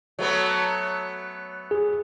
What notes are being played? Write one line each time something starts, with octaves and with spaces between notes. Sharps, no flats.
F#3 A3 B3
G#4